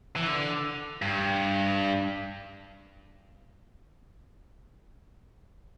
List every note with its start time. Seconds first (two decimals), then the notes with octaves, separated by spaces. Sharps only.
0.16 E3
0.27 D3
1.02 G2